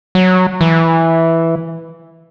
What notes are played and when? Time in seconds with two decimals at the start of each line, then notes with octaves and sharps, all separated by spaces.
0.15 F#3
0.61 E3